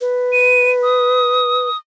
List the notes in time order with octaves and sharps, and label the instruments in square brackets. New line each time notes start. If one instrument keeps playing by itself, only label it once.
[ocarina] B4
[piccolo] D#7
D#6